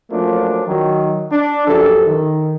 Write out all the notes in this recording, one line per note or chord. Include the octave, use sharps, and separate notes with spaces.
F3 F#3 A3 A#3 C#4 D4
D#3 F#3
D4
A#1 F#2 F3 G4 A4
D#3